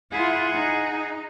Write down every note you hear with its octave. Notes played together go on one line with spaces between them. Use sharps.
E4 F4 G#4 F#5
D#4